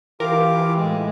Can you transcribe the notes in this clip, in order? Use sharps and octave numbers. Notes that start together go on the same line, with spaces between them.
E3 F4 G4 A#4 F5 D6
A2 G#3 F4